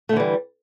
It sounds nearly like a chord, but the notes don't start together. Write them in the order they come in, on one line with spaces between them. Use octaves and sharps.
A3 D3 E3 G3